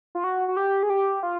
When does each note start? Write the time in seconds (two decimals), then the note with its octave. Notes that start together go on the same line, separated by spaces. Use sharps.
0.15 F4
0.24 F#4
0.48 F#4
0.57 G4
0.83 G#4
0.90 G4
1.23 F4